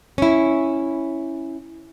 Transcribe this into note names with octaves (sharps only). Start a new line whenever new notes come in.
C#4 E4